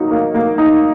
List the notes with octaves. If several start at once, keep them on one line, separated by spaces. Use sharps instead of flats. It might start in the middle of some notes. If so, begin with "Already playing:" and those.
Already playing: F#3 A#3 D#4
A#3
A#3
D#4